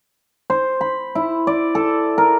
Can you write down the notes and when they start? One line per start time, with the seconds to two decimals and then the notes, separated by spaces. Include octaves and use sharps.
0.50 C5
0.81 B5
1.15 E4
1.47 D5
1.75 A4
2.18 A#4